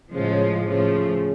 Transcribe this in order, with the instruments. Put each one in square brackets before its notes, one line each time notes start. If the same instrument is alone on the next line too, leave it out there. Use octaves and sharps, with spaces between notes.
[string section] A2 F3 G#3 [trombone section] C#3
[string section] A2 F3 A3 [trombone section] C#3